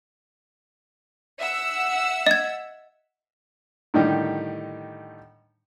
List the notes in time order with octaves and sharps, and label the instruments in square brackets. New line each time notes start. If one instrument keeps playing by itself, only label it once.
[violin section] E5 F#5 E6
[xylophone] D#5 G#6
[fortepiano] A2 D3 D#3 G3 D#4 G4